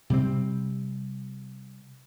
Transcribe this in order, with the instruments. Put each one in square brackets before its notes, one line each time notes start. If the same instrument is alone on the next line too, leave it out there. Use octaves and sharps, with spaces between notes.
[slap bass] C3 G3 C4